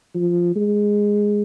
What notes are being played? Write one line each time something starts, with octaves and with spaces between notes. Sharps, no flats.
F3
G#3